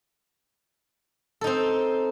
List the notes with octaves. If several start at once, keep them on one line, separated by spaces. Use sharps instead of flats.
C4 D#4 A4